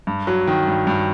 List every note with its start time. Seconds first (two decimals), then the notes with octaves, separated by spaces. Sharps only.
0.07 G2
0.27 F#3
0.47 D#3
0.67 G2
0.87 G2